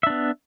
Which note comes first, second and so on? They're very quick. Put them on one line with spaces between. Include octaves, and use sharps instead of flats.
E5 D4 B3